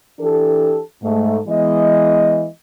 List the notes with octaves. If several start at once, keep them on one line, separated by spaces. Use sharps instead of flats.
E3 D4 G4 A4
G#2 A3
E3 G#3 B3 D#5